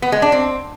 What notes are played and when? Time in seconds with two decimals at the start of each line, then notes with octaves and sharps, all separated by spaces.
0.02 B3
0.12 G#3
0.22 D4
0.32 C4